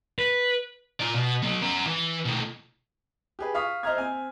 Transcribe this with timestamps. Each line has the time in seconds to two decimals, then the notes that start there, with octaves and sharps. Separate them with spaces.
0.19 B4
1.00 F4 D5
1.14 B2
1.42 F#3 B3
1.62 C#4 A#4
1.86 E3
2.25 B2 A3
3.39 G4 G#4 B4
3.55 F5 C#6 D#6 B6
3.83 C5 D#5 E5 A#5 F6 G#6
3.97 C4 G#5